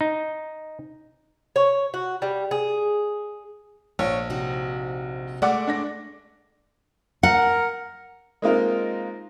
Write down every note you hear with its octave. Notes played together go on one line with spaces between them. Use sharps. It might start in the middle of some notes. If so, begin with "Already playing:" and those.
D#4
C#5
F#4
G3
G#4
A#1 C#5
C3 D#4 F#4
G#3 A3 D5 F#5 D6
D4 D5 A#6
A#4 F#5
G#3 A#3 C4 D#4 F4 A#4